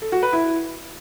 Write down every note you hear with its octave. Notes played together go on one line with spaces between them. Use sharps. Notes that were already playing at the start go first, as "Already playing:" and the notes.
A4
F#4
B4
E4